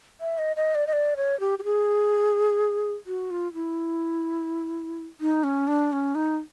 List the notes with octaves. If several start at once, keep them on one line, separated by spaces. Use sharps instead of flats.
E5
D#5
D#5
D5
D#5
D5
C#5
G4
G4
G#4
F#4
F4
E4
D#4
C#4
D4
C#4
D#4